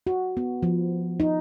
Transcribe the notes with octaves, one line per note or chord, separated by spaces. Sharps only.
F#4
B3
F3
D#4